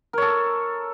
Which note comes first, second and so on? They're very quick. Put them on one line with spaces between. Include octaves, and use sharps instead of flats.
A#4 C#5 A4